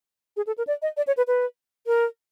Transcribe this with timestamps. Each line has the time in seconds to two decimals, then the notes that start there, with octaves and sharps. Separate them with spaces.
0.37 G#4
0.47 A4
0.58 A#4
0.67 D5
0.82 D#5
0.97 D5
1.07 C#5
1.17 B4
1.27 B4
1.87 A#4